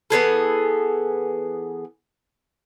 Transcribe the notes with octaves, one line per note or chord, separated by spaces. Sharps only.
E3 B3 G#4 A4